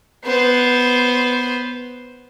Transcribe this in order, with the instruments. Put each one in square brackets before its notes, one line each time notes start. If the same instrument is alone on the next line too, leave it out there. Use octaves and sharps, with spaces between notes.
[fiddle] B3 C5